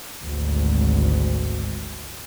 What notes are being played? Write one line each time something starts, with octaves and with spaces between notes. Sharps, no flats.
G#1 D2